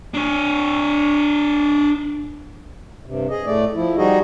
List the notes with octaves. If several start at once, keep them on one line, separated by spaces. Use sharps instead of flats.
D4 C#5
G2 C3
G#4 D#5
A2 A3 D5
F3 E4
G3 D#4 F#4 G#4 D#5